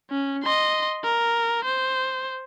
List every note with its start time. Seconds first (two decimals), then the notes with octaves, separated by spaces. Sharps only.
0.10 C#4
0.43 D#5 C6
1.04 A#4
1.64 C5